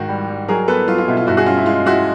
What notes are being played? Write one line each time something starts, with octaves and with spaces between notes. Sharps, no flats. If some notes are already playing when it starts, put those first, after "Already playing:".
Already playing: G#2 D#3 F#4
G3
G3
F#3 G#4 A#4
B3 A4 B4
F#3 F4
F4
B2 E4
F4
G2 E4 F#4
F#4 G#4
C#4 F4
E4
G#3 F4
G#3 E4 F#4